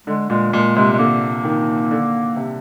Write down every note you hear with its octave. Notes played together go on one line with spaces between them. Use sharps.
D3 G#3
A#2 G#3
A#2 G#3
C3 G#3
G#3
D3 A#3
D#3
D3
C3